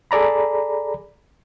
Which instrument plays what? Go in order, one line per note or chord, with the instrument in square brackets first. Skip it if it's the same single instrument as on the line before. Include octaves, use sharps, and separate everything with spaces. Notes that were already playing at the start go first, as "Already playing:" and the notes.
[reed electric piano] G#4 A4 D5 A#5 B5